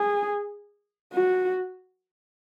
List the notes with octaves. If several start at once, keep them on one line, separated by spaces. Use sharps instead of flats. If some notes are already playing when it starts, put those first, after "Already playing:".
Already playing: G#4
F#4